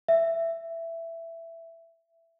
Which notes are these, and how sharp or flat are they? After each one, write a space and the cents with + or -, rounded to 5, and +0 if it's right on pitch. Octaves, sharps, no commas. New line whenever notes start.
E5 +10